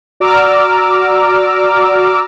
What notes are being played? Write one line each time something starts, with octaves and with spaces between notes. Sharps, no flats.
F#4 D5 A#5 D6 E6 F6